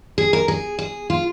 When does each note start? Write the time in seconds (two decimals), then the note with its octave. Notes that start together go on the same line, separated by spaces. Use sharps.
0.18 G#4
0.33 A#4
0.48 G#4
0.79 G#4
1.10 F4